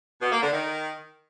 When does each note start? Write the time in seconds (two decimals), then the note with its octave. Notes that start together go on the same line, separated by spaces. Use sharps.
0.22 B2
0.32 A#3
0.42 D3
0.53 D#3